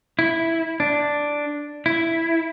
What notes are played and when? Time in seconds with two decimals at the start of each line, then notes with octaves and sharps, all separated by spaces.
0.19 E4
0.80 D4
1.86 E4